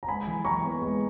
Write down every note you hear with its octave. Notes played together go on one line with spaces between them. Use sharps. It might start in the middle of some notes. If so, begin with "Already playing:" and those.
A#5
G#3 G#5 B5
E3
E3 A#5 C#6
B3
G#3